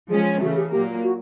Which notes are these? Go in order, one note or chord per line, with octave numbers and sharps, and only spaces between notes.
F3 G#3 C#4 G#4
C#3 E3 A3 F#4
G4
A#2 F#3 A#3 G4
F#4